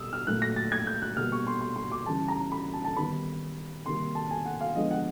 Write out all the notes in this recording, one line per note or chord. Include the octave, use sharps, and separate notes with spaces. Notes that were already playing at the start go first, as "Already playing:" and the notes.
Already playing: B2 G3 D#6 E6
F6
A#2 F#3 A3 F#6
A#6
A6
G#6
G6
F#6
B2 G3 A#3 F6
C#6
C6
C6
C6
D6
C#3 E3 G3 A5
A#5
B5
A5
A5
D#3 G3 B3 B5
C3 D#3 G3 A#3 C6
A5
G#5
F#5
F5
D3 F3 G#3 B3 D#5
F#5